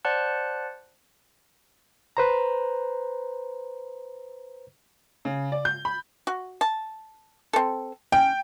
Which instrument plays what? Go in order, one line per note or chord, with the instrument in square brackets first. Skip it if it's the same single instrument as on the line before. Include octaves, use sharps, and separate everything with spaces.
[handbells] C5 D5 F#5 A5 F#6
[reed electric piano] B4 C5 A#5
[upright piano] C#3
D5
G6
B5
[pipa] F#4
A5
C4 A4
[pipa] C#4 [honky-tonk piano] G5